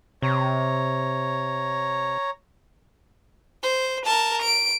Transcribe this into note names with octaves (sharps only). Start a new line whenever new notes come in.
C3 C#5 A#5
C5
A#4 A5
D7